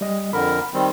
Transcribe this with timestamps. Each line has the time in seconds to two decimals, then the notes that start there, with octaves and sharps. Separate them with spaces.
0.01 G3 D#5
0.33 F2 D3 A#4 B5
0.74 D#3 G3 C4